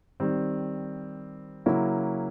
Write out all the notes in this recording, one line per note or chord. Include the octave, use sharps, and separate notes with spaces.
D#3 G3 C4
C#3 F#3 A#3 C#4 E4